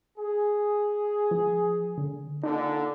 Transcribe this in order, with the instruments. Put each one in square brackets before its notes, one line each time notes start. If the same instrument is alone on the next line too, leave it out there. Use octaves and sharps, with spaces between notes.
[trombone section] G#4
[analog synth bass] F3
D3
[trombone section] A#2 D3 [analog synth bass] D#4